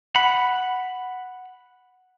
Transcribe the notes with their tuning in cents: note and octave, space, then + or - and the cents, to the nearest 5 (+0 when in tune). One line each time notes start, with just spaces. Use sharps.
F#5 +0 B5 +0